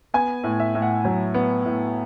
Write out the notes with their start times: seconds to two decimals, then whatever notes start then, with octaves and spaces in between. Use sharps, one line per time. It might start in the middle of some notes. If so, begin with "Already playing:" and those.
0.14 B3 G#5
0.44 A2
0.60 E5
0.75 A2
0.82 F#5
1.05 F#3
1.34 B3
1.65 A2